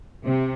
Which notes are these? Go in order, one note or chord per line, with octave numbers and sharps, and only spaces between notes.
C3